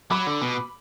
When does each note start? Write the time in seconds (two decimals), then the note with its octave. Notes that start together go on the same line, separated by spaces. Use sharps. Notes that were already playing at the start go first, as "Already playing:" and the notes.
0.11 F#3 B5 D6
0.27 D3
0.42 B2